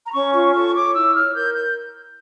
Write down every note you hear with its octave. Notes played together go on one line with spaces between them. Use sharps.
A#5
C#4 C#6
F4 C#6
A4 C#6
C#5 D6
E4 E6
C#5 F6
A#4 G6
G6